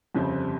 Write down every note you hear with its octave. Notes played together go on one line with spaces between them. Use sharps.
G1 F2 C#3 G3 C4